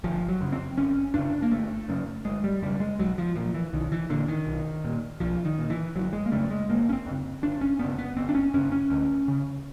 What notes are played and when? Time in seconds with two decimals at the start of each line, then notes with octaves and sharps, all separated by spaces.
0.04 G1 F3
0.28 F#3
0.41 F#2 C#3
0.52 C4
0.77 G1 C#4
1.14 F#2 C#3 D4
1.42 A#3
1.52 G1 A3
1.89 F#2 C#3
2.25 G1 G#3
2.44 G3
2.62 F#2 C#3 G3
2.80 G#3
2.99 B1 F#3
3.18 F3
3.36 A#2 F3
3.54 E3
3.73 B1 D#3
3.92 E3
4.10 A#2 D3
4.28 D#3
4.47 B1
4.84 A#2
5.20 B1 F3
5.45 D#3
5.58 A#2
5.70 E3
5.95 G1 F#3
6.13 G#3
6.26 A#3
6.32 F#2 C#3 A3
6.51 G#3
6.69 G1 A#3
6.89 C#4
6.93 C4
7.06 F#2 C#3
7.42 G1 D4
7.61 C#4
7.79 F#2 C#3 B3
7.99 B3
8.17 G1 C4
8.29 D4
8.35 C#4
8.54 F#2 C#3 C#4
8.72 C#4
8.90 D2
9.28 C#3